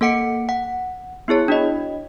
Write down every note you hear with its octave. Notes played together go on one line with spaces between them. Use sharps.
A#3 A4 F#5 C#7 D7
F#5
B3 E4 G#4 C#5
D4 F#4 D#5